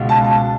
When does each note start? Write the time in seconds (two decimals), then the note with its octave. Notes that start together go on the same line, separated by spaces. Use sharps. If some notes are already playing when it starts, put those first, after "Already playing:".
Already playing: C#2 B2
0.09 A5
0.24 A5